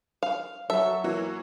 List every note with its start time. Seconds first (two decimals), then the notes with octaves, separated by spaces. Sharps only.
0.23 F5
0.70 F#3 A4 E5
1.04 E3 A#3 F#4